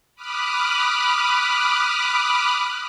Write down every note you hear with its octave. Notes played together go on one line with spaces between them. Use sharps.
B5 D6 D#6 F6 F#6